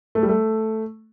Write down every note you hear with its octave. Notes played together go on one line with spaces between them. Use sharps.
A3
G3
A3